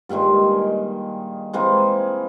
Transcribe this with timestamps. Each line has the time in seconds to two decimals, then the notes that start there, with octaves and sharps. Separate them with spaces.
0.09 G2 A#2 D#3 G#3
1.53 E3 G#3 A#3 C4